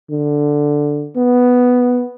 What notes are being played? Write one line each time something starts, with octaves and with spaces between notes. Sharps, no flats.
D3
B3